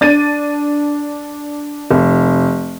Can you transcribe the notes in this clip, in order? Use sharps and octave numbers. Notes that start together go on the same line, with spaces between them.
D4 A6 D#7
F1